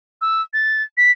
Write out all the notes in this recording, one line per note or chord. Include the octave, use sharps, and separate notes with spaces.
E6
A6
B6